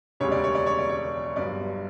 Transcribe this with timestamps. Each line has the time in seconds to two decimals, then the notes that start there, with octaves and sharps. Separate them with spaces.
0.20 E1 D2 C#3 G3 C#5
0.32 D5
0.44 C#5
0.55 D5
0.66 C#5
0.78 D5
0.89 C#5
1.36 G1 G2 F#3 D5